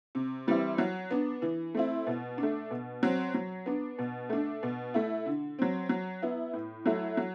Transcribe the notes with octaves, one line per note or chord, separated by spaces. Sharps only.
C3
E3 G3 C4 E4
F#3
B3 D4
E3
A3 C4 E4
B2
D4
A3
B2
F#3 C4
F#3
B3 D4
B2
A3 D4
B2
A3 E4
D3
F#3 C4
F#3
B3 E4
A2
F#3 A3 E4
F#3